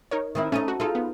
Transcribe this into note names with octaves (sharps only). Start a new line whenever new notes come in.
D#4 A#4 C#5
D#3 C4 E4
A3 C#4 D#4 D#7
F#4
D#4 F4 G#4 A4
B3